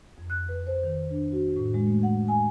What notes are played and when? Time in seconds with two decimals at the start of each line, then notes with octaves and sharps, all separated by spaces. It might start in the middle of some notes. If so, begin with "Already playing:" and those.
0.18 F2
0.30 F#6
0.49 B4
0.67 C5
0.83 D#3
1.10 D4
1.32 F#4
1.56 A2
1.74 G#3
1.87 A3
2.03 F#5
2.28 G#5